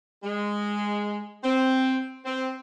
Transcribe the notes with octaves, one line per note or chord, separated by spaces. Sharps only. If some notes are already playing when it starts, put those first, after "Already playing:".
G#3
C4
C4